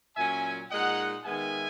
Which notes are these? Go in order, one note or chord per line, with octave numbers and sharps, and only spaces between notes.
A#2 F#3 C#4 E5 G#5
A#2 G#3 D#4 D#5 F#5
D#3 G#3 B3 E5 G#5